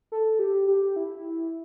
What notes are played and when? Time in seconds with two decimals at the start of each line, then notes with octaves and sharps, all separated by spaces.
0.12 A4
0.39 G4
0.68 G4
0.96 E4